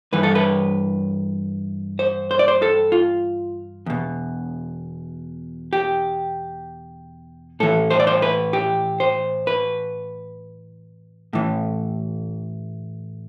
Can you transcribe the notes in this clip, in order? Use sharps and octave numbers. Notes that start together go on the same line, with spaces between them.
G2 E3 B4
A4
B4
C5
C5
D5
C5
A4
F4
E2 B2
G4
A2 E3 A4
C5
D5
C5
B4
G4
C5
B4
A2 E3